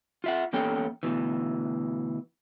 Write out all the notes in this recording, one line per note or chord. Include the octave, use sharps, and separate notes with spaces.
F4 E5 F#5
E2 A#3 C#4 A4 G5
D2 B2 E3